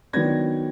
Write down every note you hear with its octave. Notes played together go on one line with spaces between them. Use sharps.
D#3 F#3 B3 D4 G#6 A#6